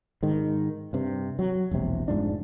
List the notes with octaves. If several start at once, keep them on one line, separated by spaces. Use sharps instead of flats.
G#2 D#3
G2 C3
F#3
E1 A#1 C3
F1 G#2 F3 D4